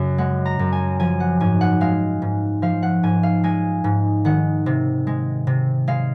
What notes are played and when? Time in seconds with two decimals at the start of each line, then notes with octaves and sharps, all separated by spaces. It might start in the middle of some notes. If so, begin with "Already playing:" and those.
Already playing: F#2 C#3
0.18 G#3 F#5
0.45 A#5
0.59 F#2
0.72 G#5
1.00 F3 G#5
1.20 F#5
1.40 G#2 G#5
1.61 F#5
1.81 G#3 F5
2.22 G#2
2.62 F3 F5
2.83 F#5
3.03 G#2 G#5
3.23 F5
3.44 G#3 G#5
3.84 G#2
4.25 D#3 F#5
4.66 C3
5.07 G#3
5.47 C3
5.87 G#3 F5